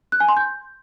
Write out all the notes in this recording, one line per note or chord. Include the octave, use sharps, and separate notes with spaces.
F#6
G#5
C6
G6